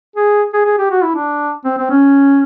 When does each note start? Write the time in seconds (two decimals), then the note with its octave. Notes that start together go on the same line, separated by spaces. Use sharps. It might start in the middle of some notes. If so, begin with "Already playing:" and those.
0.16 G#4
0.53 G#4
0.65 G#4
0.78 G4
0.91 F#4
1.02 E4
1.15 D4
1.65 C4
1.78 C4
1.90 C#4